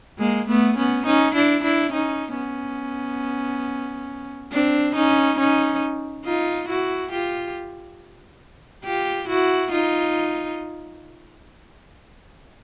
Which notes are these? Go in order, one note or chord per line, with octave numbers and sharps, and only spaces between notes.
G#3 A#3
A3 B3
B3 C#4
C#4 D#4
D4 E4
D4 E4
C#4 D#4
B3 C#4
C4 D4
C#4 D#4
C#4 D#4
D#4 F4
E4 F#4
F4 G4
F4 G4
E4 F#4
D#4 F4